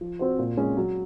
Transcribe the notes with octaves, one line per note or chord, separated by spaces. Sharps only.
F3
C4 F#4 C5
A#2
G#3 C#4 G#4
F#3